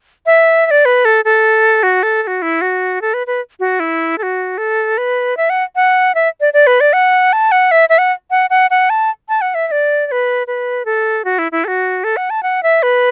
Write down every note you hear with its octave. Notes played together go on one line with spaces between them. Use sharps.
E5
E5
D5
B4
A4
A4
F#4
A4
A4
F#4
E4
F#4
A4
B4
B4
F#4
E4
A4
F#4
A4
B4
E5
F#5
F#5
E5
D5
D5
B4
D5
F#5
A5
F#5
E5
E5
F#5
F#5
F#5
F#5
A5
A5
F#5
E5
E5
D5
D5
B4
B4
A4
F#4
E4
E4
A4
F#4
A4
F#5
A5
F#5
E5
B4